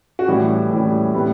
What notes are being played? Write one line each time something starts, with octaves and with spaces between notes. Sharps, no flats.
F#4
A2 E3 G3 C#4 G4
A2 E3 G3 C#4
A2 G3 B3